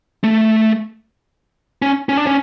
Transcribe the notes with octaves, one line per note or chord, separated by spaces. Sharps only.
A3
C#4
C#4
D4
C#4